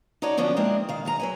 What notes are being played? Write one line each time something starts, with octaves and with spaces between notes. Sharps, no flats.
D#4 F#4 A4 C#5 D5
D3 F3 B3 C#4 D4
G#3 A#3 C4 D4 E4
D#3 F5
F#2 G#4 A#5
F#3 B4 G#5